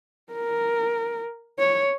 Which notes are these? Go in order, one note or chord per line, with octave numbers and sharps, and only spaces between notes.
A#4
C#5